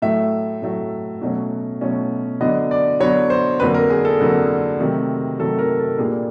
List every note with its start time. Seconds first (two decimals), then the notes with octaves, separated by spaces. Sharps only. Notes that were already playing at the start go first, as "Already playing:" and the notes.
0.02 A2 F#3 A3 E5
0.62 A2 F#3 A3
1.22 B2 F#3 A3 C#4
1.81 B2 F#3 A3 C#4
2.41 D3 F#3 B3 D4 D#5
2.71 D5
3.00 D3 F#3 B3 D4 C#5
3.30 C5
3.60 F2 D3 F#3 A#3 B4
3.74 A#4
3.90 G#4
4.05 A4
4.20 F2 D3 F#3 A#3
4.80 C3 D#3 F#3 A3
5.39 C3 D#3 F#3 A3 A4
5.59 A#4
5.79 A4
5.99 A#2 G3 A#3 D4 G#4